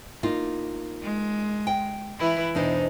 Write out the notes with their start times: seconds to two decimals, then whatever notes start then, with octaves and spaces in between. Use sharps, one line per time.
0.23 A#3 D#4 F4
1.03 G#3
1.67 G5
2.18 E3 E4 B4
2.55 E2 B2 D4 D#4 C5